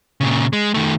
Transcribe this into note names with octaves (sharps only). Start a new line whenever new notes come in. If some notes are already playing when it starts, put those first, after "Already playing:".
A#2 C#3
G#3
D#3 A3